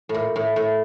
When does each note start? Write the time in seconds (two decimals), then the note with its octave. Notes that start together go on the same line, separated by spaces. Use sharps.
0.09 A2
0.14 A#2
0.36 A2
0.56 A2